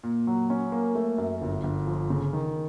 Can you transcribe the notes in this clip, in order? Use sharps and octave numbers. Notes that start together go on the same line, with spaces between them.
A#2
F#3
C#4
A#3
A3
F#2
G1
G1
F3
C#3
D#3